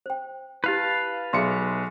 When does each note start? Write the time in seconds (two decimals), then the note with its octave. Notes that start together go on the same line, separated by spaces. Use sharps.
0.06 C5 G5
0.64 E4 G4 B4 F5 A5
1.33 B1 G#4 E5 C6 C#7